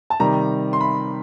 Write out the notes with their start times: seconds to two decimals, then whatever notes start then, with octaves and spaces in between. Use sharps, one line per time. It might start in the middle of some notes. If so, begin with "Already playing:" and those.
0.10 A5
0.20 C3 D#3 G3 A#5
0.73 C6
0.81 B5